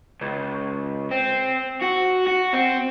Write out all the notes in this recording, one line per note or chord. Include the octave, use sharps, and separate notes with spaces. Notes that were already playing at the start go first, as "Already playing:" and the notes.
C#2
C4
F#4
F#4
C4